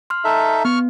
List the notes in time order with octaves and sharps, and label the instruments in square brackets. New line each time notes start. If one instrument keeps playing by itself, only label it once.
[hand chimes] C6 F6
[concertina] D#4 A4 E5
[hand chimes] B3 [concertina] C#6 F6